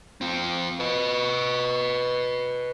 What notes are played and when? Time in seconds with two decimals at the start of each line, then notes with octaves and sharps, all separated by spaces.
0.21 C4 F4
0.80 B4 D#5